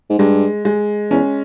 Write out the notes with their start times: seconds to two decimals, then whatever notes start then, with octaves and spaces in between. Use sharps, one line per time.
0.09 G#2
0.18 G2 G#3
0.65 G#3
1.10 E2 C#4